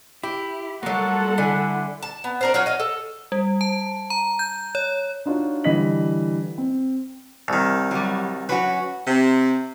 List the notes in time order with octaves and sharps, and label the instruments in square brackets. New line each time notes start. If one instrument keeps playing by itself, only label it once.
[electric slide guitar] E4 [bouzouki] G4
[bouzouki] F#3 F4 [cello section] G3 A4 [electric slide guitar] A3 A#3 [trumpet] F#5
[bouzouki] D3 G#5 [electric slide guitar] E4
[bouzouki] A5
B3
D4 A#4 C5
F#3 F4 F#4 C#5
D#5 F5
A4
[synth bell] G3
A5
A#5
G6
C#5
[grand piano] D4 D#4 F4 F#4 C#5
D3 E3 G3 D#5 B6 F#7
C4
[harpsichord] C2 D#3
[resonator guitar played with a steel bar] F#3 G3
[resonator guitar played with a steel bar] F#3 C#4 F#4 [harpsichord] B4
[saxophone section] C3